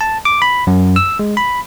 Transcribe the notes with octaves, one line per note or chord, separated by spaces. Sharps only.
A5
D6
B5
F#2
E6
G#3
B5